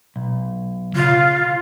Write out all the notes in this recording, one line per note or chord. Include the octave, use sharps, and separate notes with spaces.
B1
C#3 F4 F5